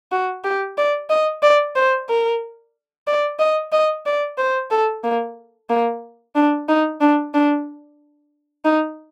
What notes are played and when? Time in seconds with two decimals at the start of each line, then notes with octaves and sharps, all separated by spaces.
0.12 F#4
0.45 G4
0.78 D5
1.10 D#5
1.43 D5
1.76 C5
2.09 A#4
3.08 D5
3.39 D#5
3.72 D#5
4.06 D5
4.38 C5
4.71 A4
5.04 A#3
5.70 A#3
6.36 D4
6.69 D#4
7.01 D4
7.34 D4
8.65 D#4